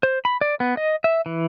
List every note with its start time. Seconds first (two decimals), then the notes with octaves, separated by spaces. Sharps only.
0.03 C5
0.25 B5
0.41 D5
0.60 B3
0.77 D#5
1.04 E5
1.26 E3